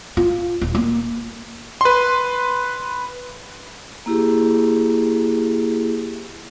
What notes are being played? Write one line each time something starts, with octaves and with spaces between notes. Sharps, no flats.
F4
D#1
A#3
B4 C6
A#3 E4 G4 G#4